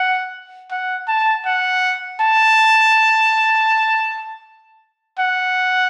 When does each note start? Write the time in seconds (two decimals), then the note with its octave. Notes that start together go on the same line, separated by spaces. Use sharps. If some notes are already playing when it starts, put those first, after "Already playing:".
Already playing: F#5
0.71 F#5
1.08 A5
1.46 F#5
2.20 A5
5.19 F#5